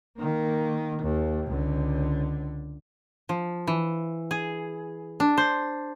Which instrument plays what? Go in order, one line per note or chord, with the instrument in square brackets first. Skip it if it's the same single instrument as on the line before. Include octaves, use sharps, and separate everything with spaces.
[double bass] D#3 A#3
D#2
C#2 D3
[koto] F3
E3
G#4
D4
C5